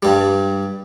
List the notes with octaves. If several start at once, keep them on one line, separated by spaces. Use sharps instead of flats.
G2 G3